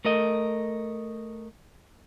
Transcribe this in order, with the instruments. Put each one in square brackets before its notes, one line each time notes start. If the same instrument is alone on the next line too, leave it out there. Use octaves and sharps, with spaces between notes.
[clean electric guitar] A3 A#4 D#5